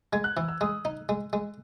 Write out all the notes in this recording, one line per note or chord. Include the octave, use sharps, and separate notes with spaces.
G#3 G#6
F#6
E3 E6
E6
G#3 D#6
D#4
G#3
G#3